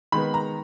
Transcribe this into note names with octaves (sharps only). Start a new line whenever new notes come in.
D#3 G#3 B3 B5
A#5